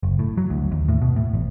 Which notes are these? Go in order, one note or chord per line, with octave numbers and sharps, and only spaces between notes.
F#1
A2
F#3
D2
D#2
A2
B2
A2
A1